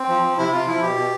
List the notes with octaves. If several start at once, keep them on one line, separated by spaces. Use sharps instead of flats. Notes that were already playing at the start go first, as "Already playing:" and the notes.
Already playing: C4
F3
F3
C3 E4
C3 F4
F3 E4
B2 G4
B2